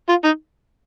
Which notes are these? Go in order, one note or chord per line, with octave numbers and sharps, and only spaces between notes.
F4
D#4